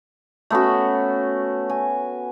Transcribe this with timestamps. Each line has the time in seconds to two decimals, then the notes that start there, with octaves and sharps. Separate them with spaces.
0.50 A3 B3 C#4 F#4
1.70 G#5